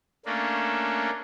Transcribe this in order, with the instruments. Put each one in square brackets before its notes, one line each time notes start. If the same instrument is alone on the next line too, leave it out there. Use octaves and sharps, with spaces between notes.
[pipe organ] A3 A#3 C#4 D4